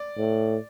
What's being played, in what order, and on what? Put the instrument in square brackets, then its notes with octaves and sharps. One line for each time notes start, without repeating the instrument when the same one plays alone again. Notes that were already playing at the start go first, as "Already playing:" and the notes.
Already playing: [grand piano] D5
[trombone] A2